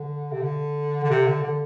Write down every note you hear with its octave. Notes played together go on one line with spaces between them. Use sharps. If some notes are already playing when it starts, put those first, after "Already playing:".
Already playing: D3
C3
D3
D3
C3
D3
D3